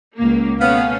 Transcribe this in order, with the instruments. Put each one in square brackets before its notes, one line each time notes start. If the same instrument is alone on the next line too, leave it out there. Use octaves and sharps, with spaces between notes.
[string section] C#2 A#3
[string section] B2 A3 C#4 [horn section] B3 [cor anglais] F5